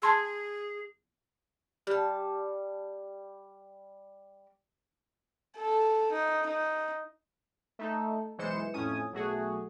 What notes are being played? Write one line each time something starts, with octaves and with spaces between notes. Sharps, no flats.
G#4 A5 C6 E6
G3 A5
A4
D#4
D#4
A3 D#4 A4
B1 E3 G#3 C5 C#7 E7
F2 A2 C#4 G#5 D#6
B1 A3 F#4 G#4